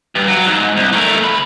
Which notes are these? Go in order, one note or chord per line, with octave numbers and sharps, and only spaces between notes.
G2
F#3
G#2
C2
A3 A#4
D2 B5